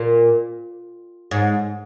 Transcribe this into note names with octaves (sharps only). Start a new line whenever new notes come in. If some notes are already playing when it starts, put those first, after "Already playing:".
Already playing: A#2
G#2